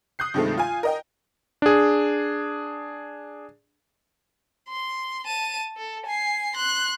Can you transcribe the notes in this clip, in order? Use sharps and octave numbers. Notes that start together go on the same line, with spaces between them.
D#6 F#6 G6 C7
G2 C3 D#3 F3 G#3 A3
F4 F5 G#5
A#4 D#5 G5
D4 G#4
C6
A5 D#7
A4
G#5 C7
C6 F#6